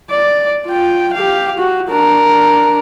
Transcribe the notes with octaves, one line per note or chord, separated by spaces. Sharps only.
D5
F4 G5
G4 F5
F#4
D4 A#4